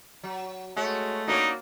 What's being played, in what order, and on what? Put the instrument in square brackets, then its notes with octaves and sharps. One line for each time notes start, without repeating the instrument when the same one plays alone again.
[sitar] F#3
[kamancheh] G#3 C#5 [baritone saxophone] A3 [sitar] F#4
[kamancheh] A#3 F#4 [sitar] D4 B4 C#5 [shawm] D#4